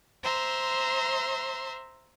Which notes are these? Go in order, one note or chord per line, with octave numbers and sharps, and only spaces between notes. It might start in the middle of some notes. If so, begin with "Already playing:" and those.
C5 E5 A#5 C6